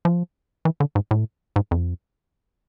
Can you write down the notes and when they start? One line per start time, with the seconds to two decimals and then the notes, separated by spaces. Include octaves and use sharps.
0.05 F3
0.65 E3
0.80 D3
0.95 G#2
1.11 A2
1.56 G#2
1.71 F2